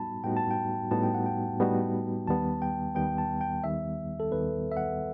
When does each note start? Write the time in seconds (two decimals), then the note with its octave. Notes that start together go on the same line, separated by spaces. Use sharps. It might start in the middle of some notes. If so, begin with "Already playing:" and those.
Already playing: A2 G3 B3 D#4 F#4 A5 B5
0.24 A2 G3 B3 D#4 F#4 G5
0.37 A5
0.51 G5
0.91 A2 G3 B3 D#4 F#4 A5
1.03 G5
1.14 F#5
1.26 G5
1.59 A2 G3 B3 D#4 F#4
2.28 D#2 D#3 G3 B3 A5
2.62 G5
2.95 D#2 D#3 G3 B3 G5
3.18 A5
3.41 G5
3.64 D#2 D#3 G3 B3 E5
4.20 A4
4.32 D#2 D#3 G3 B3 B4
4.71 E5
4.77 F#5